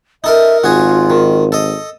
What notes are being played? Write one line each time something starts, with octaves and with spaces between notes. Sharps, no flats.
D#4 A4 A#4 E5
G#1 F4 F#4 G#4
D#3
A4 D#5